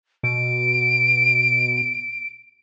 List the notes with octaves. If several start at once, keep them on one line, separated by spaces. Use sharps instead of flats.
B2 D7